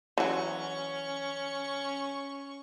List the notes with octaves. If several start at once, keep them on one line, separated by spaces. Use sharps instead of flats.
E3 F#3 C#4 C#6